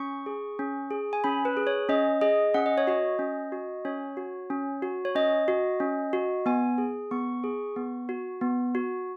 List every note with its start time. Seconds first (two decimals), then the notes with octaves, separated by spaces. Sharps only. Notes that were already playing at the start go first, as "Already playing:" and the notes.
Already playing: C#4 C#6
0.26 G#4
0.59 C#4
0.91 G#4
1.13 G#5
1.24 C#4 B5
1.45 B4
1.57 G#4
1.67 C#5
1.89 C#4 D#5
2.21 G#4 D#5
2.54 C#4 F#5
2.66 D#5
2.78 C#5
2.87 F#4 D#5
3.19 C#4
3.52 F#4
3.85 C#4 C#5
4.17 F#4
4.50 C#4
4.82 F#4
5.05 C#5
5.15 C#4 D#5
5.48 F#4
5.80 C#4
6.13 F#4
6.46 B3 G#5
6.78 G#4
7.11 B3 C#6
7.44 G#4
7.76 B3
8.09 F#4
8.41 B3
8.75 F#4